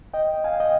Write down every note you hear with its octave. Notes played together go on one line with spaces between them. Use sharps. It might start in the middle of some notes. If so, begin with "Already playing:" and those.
D#5 G5
F5 G#5
D#5 G5